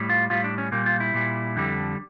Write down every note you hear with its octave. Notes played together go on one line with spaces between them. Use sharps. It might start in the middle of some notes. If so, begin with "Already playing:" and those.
Already playing: A2 G3
F4
A2 G3 F4
D4
C#4
A#2 G3 A#3
F4
E4
A#2 G3
F2 D3 G3